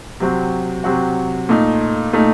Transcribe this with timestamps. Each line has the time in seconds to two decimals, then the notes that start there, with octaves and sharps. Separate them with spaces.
0.20 C3 F#3 C4 F#4
0.84 C3 F#3 C4 F#4
1.49 A#2 A3 D#4
2.13 A#2 A3 D#4